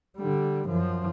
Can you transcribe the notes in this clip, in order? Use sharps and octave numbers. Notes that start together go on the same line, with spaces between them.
D3 G3
F#2 F3